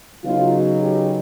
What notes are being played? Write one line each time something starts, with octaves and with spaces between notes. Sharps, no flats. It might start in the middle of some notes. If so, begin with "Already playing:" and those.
C#3 F#3 B3 D#4 F4
F#4
G4